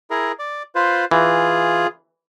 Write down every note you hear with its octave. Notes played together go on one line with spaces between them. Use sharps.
E4 G#4 A#4
D5
F4 B4 C5
E3 F4 G#4